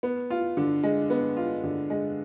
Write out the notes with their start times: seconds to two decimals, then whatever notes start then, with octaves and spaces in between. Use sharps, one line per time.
0.03 B3
0.30 F4
0.57 D3
0.83 G#3
1.10 B3
1.37 F4
1.64 D3
1.90 G#3